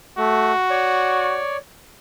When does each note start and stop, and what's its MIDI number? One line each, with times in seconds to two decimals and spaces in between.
0.18 0.53 57
0.18 1.40 66
0.70 1.57 73
0.70 1.57 74